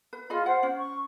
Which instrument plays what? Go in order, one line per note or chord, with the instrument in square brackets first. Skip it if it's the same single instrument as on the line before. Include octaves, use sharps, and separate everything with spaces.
[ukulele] B4
[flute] F4 [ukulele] G#4 D#5 B5
[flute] C5 [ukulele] F#5
[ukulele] C#4
[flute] C#6